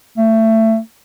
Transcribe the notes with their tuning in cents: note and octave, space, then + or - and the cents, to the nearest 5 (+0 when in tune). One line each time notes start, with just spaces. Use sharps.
A3 +20